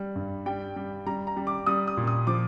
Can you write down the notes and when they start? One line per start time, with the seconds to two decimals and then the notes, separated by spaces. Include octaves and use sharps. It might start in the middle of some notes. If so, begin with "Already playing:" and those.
Already playing: G3
0.15 G2
0.46 G3 G5
0.76 G3
1.06 G3 A#5
1.27 A#5
1.37 G3
1.47 D6
1.66 G3 D#6
1.87 D#6
1.97 A#2
2.07 D#6
2.27 F3 D6